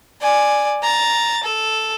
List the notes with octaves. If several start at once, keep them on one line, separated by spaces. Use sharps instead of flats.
D5 G#5
A#5 A6
A4